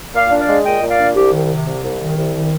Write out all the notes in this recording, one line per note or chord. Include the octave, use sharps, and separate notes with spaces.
A#2 D5 F5
D4
D5 F5
G#3
A#2 D#5 G5
A#2
D5 F5
D4
C2 G4
D#3
C3
C2
C2
D#3
C2
D#3